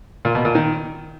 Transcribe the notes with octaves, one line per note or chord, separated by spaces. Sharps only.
A#2
B2
A#2
D#3